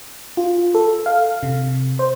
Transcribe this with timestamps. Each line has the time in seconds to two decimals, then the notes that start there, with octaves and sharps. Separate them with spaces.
0.37 F4
0.75 A4
1.06 F5
1.43 C3
1.99 C5